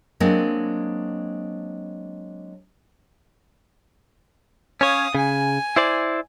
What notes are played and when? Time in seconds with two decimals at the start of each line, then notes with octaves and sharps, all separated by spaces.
0.20 F#3 G#3 A#3 C4 D4 D#5
4.81 C#4 C#5 F5 D#6
5.15 C#3 G#5
5.76 E4 C5 D5